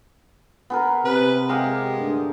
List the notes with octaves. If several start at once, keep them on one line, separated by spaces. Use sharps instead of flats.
B3 G#4 A#4
C3 C4 B4
G#3 G4 F5 G#5
G2 D3 A3